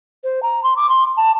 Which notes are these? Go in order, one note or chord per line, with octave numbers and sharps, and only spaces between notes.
C5
A#5
C6
D6
C6
A5